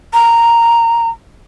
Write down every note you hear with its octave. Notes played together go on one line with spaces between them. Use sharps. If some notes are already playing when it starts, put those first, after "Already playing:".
A#5